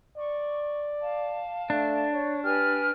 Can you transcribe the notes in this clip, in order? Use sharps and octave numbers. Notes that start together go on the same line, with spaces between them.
D5 C#6
F5 A5
A3 D4
C#5
G4 B4 G#5 F6